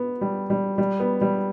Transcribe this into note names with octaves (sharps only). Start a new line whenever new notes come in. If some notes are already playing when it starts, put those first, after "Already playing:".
Already playing: B3
G3
G3
G3
B3
G3